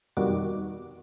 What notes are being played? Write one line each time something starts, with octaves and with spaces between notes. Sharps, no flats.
F2 B2 D#3 G3 F#4 D6